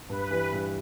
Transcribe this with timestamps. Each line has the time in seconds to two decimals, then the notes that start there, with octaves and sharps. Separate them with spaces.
0.10 G2 B4
0.31 E3 G3
0.53 G2